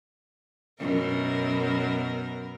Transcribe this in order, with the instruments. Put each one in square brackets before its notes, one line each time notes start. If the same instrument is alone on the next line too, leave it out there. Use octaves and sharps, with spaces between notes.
[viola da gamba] F#2 B2 A#4